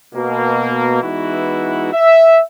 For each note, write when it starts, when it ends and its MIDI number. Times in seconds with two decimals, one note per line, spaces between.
0.14 0.98 47
0.14 0.98 58
1.02 1.92 52
1.02 1.92 56
1.02 1.92 59
1.02 1.92 63
1.02 1.92 64
1.02 1.92 66
1.93 2.41 76